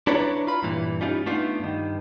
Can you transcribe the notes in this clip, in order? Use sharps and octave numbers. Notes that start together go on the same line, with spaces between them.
D4 E4 B4 C#5 D5 A#5
F4 B5
G2 A#2 E3
G3 C#4 D#4 F4
A3 B3 D4 D#4 F4
G2 D#3